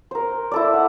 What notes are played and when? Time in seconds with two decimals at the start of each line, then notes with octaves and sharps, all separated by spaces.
0.11 A#4 C5
0.51 E4 A4 D5
0.73 F#5